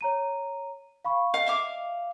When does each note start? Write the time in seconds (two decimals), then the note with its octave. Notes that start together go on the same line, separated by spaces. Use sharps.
0.01 C#5 A#5 D#7
1.05 F5 B5 C#6
1.34 D#5 F5
1.47 E5 F5 D6